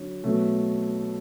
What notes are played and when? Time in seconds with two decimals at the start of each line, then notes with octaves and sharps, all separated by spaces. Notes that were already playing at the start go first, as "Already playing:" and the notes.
Already playing: D3 F#3
0.23 B2 F#3 A3